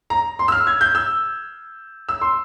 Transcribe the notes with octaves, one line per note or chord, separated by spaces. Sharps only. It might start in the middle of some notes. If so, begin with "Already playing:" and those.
A#5
C6
E6
F6
G#6
G6
E6
E6
C6